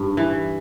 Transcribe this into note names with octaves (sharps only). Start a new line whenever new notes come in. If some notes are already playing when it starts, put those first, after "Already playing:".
Already playing: G2
E3